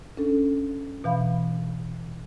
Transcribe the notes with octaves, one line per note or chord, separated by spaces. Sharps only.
C#4 D4 A4
B2 E3 F5 B5